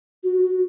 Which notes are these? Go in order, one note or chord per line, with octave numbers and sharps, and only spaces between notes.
F#4
F#4